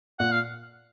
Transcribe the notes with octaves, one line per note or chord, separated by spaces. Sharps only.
A#2 F#5
F5